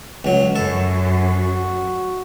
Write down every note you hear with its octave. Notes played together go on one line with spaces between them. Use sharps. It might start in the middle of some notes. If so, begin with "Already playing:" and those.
C#2 F#3
F#2 A4
F#4